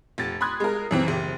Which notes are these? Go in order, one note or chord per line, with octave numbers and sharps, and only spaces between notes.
F1 A6
B5 C6 D#6 F#6 G#6
G#3 A#4
F#2 E3 C4
F#1 G4